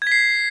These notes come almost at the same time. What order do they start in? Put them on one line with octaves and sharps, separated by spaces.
G#6 B6 C7